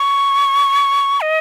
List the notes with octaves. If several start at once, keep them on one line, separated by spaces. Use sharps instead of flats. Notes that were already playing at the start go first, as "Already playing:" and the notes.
Already playing: C#6
D#5